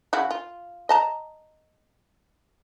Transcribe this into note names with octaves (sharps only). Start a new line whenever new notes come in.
C#3 E4 F#4
F4
D#5 A5 A#5